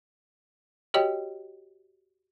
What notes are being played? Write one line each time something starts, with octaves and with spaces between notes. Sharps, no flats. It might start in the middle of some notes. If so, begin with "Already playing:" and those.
F#4 G4 C#5 D#5 G5